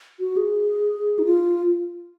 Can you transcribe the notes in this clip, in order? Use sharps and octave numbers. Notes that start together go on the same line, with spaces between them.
F#4
G#4
D#4
F4